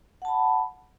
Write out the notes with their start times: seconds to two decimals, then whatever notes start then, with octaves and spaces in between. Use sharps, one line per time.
0.22 F#5
0.25 A5
0.28 B5